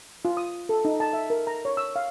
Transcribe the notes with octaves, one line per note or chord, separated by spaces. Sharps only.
F4
D#6
A4
D#4
A5
E5
A#4
A#5
C#5
E6
F5